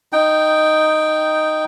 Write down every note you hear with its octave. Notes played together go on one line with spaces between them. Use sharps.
D#4 G5